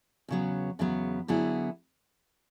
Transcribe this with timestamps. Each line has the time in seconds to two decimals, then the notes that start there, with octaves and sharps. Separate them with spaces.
0.28 E2 C#3 F#3 B3
0.79 E2 C#3 F#3 B3
1.28 D3 F#3 B3 E4 G#4